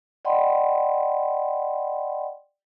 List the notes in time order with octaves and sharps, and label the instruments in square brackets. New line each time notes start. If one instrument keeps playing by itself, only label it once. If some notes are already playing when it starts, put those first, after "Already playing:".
[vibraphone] D5 D#5 F#5 G5 B5 C6